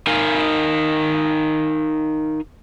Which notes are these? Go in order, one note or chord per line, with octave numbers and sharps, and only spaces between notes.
D#4 A#4 F5 G#5